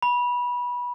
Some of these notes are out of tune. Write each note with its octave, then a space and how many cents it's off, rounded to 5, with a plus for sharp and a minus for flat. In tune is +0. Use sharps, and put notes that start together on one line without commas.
B5 -20